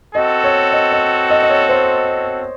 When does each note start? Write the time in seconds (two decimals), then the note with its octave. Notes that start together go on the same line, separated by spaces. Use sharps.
0.15 C4 F#4 A4 D#5
0.44 C#5
0.73 D#5
0.92 D#5
1.30 D#5
1.42 D#5
1.50 C#5
1.69 C5